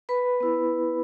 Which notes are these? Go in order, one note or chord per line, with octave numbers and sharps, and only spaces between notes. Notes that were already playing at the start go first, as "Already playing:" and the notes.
B4 B5
B3 E4